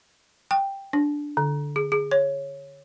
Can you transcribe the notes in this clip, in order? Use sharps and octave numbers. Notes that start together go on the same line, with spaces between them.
G5
D4
D3
G#4
G#4
C#5